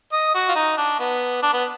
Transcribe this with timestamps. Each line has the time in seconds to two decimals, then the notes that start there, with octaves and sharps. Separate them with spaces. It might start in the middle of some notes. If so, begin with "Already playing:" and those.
0.12 D#5
0.35 F#4
0.49 F4
0.55 D#4
0.77 D4
1.00 B3
1.43 D4
1.53 B3